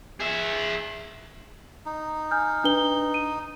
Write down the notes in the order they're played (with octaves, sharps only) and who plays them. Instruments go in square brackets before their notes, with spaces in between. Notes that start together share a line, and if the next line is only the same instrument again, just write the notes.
[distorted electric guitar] G#4 E5
[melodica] D#4
[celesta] G#5 F6 G6
D4 B4 G7
D#7